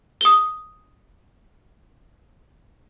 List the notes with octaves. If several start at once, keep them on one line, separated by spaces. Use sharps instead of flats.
D#6 G7